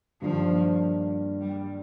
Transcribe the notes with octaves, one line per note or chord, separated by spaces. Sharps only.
G2 D#3 F3 A#3 D4
G3